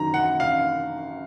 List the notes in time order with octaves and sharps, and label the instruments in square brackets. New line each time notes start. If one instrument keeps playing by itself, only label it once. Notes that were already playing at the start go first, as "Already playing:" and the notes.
Already playing: [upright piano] F#2 D#3 F#3 [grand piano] A#5
[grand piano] F#5
F5